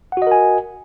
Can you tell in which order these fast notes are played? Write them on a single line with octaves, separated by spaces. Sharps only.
F#5 F#4 D#5 A#4 G#5